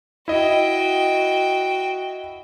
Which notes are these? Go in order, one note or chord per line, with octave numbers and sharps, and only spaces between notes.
E4 F#4 D#5 G5